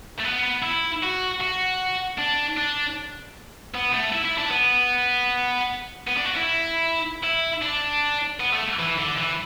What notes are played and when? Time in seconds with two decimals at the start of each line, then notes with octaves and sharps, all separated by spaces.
0.19 A3
0.24 B3
0.63 E4
1.03 F#4
1.40 F#4
2.18 D4
2.57 D4
3.74 B3
3.93 A3
4.13 E4
4.25 E4
4.38 D4
4.51 B3
6.07 B3
6.17 D4
6.26 F#4
6.36 E4
7.24 E4
7.62 D4
8.40 B3
8.53 A3
8.79 E3
8.99 D3
9.17 E3